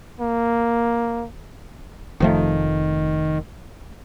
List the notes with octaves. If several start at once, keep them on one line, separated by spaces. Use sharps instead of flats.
A#3
F1 D#3 F3 A3